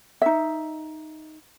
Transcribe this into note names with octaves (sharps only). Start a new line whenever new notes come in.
D#4 E5